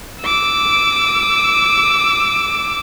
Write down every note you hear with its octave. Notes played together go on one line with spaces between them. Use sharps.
D6 E6